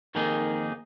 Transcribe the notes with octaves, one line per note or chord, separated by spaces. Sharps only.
F2 D#3 A#3 D#4 G#4